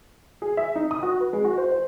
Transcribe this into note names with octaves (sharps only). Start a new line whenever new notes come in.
G#4
E5
D#4
D#6
F#4
B4
G#3
F#4
C5
C5